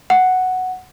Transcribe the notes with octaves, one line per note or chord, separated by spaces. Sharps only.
F#5